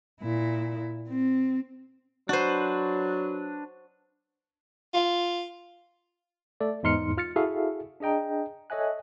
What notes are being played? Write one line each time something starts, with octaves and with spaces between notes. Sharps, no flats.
A#2 E4
C4
F#3 D4 F#4 B4 C5
F4
A3 A4 D5
E2 G#2 D#4 C6 F6 C#7
F4 F6 A6 C#7
E4 F#4 G#4 A4 E5 F5
D4 G#4 D#5 G5 A#5
A4 C#5 D#5 E5 G#5 F#6